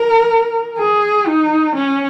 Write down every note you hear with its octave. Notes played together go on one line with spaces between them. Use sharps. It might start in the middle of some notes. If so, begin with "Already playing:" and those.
Already playing: A#4
G#4
D#4
C#4